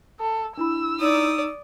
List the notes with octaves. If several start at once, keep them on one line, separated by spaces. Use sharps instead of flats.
A4
D4 E4 B5 E6
D#4 D5 D#6